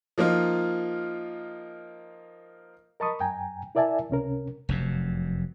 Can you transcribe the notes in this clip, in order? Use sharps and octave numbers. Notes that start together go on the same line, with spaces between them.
F3 A#3 D#4 F4
A#4 D#5 A5 B5 C#6 D#6
F#2 G5 G#5 A#5
E4 A#4 D5 E5 G#5 A5
C#2 C3 C#4 A#4
F1 F#2 C3